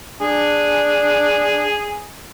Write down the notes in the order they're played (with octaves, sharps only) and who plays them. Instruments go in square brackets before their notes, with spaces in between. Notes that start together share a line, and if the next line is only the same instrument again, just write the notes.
[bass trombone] D4 [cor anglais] G#4